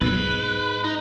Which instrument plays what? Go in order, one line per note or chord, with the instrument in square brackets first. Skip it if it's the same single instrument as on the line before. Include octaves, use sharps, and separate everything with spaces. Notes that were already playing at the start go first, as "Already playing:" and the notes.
[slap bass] B1 F2 A2 [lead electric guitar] B4
[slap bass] G#2
[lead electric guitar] D#4